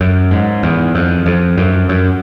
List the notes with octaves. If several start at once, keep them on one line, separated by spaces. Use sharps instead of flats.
F#2
G#2
E2
F2
F2
F#2
F#2